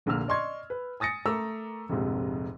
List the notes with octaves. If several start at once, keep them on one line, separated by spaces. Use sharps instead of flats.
F1 A#1 D3 A#3 E6 F6
D5 D#5 C6 C#6 G#6
B4
G#5 D#6 A6 A#6 C#7
A3 A#4 A#5 D6 E6
F1 A#1 F2 G#2 C3